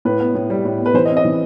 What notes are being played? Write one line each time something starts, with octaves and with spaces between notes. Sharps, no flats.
A2 B4
B3
A2
G3
A2
B3
B4
E3 C5
D#5
C4
D#5
E3